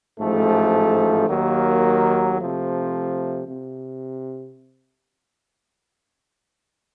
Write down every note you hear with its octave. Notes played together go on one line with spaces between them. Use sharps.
A1 G#2 F3 A3
D#2 D#3 F#3 A#3
C3 F3 A3
C3